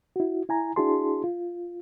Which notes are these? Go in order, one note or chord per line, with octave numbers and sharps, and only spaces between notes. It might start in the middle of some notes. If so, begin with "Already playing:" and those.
E4 F#4
E4 G#5 A#5
D4 E4 F#4 G#4 A5 C6
F4